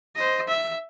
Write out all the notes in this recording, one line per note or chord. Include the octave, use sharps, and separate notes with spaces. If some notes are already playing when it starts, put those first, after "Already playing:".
C5 D#5
E5